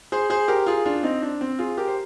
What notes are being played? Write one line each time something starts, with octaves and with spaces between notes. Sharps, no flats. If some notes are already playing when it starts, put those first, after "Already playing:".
G#4 C5
G#4 C5
G4 A#4
F4 G#4
D4 F4
C4 D#4
D4
C4
F4 G#4
G4 A#4
C5